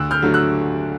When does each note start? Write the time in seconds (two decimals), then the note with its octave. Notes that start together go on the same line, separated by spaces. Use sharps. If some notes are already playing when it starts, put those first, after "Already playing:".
Already playing: D2 E6 F#6
0.11 F6 G6
0.22 D3 F#3 A3
0.34 E6 F#6